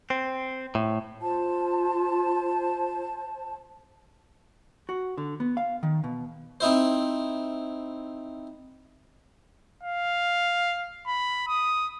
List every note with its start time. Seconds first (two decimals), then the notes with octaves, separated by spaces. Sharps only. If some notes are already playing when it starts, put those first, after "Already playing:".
0.10 C4
0.75 A2
1.21 F4 C5 A5
4.89 F#4
5.18 D3
5.40 B3
5.57 F5
5.83 D#3
6.04 B2
6.60 C4 D#4 E4 C5
9.83 F5
11.07 B5
11.48 D#6